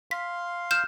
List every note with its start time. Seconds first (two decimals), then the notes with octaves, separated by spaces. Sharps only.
0.11 F5 C6 B6
0.71 F6 G6 E7